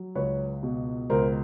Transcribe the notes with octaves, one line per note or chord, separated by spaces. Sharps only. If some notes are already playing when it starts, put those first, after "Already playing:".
Already playing: F#3
C#2 B4 C#5
B2
C#2 A#4 C5